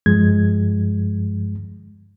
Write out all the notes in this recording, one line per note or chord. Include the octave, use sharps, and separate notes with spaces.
G2 F3 G#3 G#6